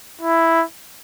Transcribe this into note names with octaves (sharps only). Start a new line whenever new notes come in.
E4